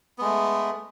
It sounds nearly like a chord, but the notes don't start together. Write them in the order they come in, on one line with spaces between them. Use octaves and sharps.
B3 G#3 A3